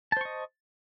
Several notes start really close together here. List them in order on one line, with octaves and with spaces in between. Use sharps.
A5 C5 C#6 D#5